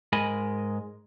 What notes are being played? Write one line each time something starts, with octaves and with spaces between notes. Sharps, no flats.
G#2 G#3 A#4 D#5 G#5 B5